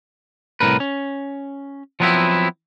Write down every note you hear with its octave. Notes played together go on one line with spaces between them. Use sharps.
C2 A2 C#3 A#4 B4
C#4
F3 F#3 B3 C4 E4